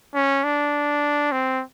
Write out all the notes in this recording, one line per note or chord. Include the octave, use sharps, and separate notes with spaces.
C#4
D4
C4